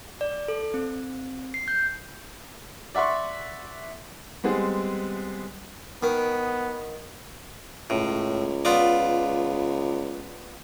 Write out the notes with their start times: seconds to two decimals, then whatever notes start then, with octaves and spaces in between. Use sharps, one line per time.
0.21 D5
0.48 A4
0.74 C4
1.54 C7
1.68 G6
2.95 D5 E5 F#5 C6 C#6
4.44 G3 G#3 B3 C4 G#4
6.03 D#3 B3
7.90 C#2 A2
8.65 B3 F4 D5